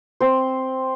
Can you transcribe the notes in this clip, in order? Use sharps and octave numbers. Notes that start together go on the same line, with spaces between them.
C4 C5